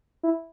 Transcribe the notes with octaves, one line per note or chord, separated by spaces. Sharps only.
E4